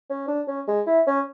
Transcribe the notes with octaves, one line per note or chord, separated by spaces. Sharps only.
C#4
D4
C#4
G#3
E4
C#4